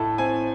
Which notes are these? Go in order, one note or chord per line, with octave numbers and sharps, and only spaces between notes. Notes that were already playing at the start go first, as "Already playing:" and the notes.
Already playing: A2 A3 A5
C4 G#5